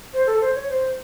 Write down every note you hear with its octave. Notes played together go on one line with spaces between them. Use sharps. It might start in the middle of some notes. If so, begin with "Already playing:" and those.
C5
A4
C5
C#5
C5